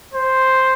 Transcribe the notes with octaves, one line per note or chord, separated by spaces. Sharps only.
C5